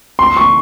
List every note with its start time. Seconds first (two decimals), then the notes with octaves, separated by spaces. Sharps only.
0.19 C6
0.37 C#6